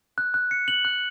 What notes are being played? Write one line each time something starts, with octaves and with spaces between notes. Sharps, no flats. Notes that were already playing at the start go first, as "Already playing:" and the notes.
F#6
F#6
C#7
F#7
F#6